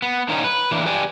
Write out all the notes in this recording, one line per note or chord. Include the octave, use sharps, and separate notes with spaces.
B3
D3 D#3 A#3 C#4 D#4
B4
E3 A#3 D4
G4 B4 D5 G5 G#5